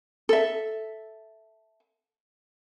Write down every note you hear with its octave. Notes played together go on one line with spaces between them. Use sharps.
A4 E5